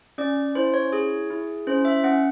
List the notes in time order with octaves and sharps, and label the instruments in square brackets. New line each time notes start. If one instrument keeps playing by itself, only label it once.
[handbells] C#4 D5
E4 C5
C#5
G#4
E4
C#4 C5
E5
C#4 F#5